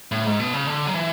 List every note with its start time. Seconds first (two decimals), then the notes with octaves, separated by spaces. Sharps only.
0.12 A2
0.26 G#2
0.40 B2
0.54 C#3
0.67 D3
0.87 F#3
0.94 E3